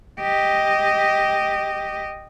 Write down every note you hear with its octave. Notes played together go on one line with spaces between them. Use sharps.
G4 D#5